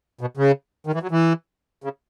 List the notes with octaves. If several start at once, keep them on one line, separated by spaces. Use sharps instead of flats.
B2
C#3
D#3
E3
F#3
E3
C#3